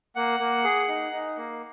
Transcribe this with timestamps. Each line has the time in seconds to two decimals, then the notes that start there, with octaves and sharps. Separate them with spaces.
0.16 A#3 F#5
0.40 A#3
0.64 G#4
0.88 D#4
1.12 D#4
1.37 A#3